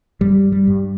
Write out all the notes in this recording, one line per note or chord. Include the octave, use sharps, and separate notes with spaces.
G2 G3
G3
G2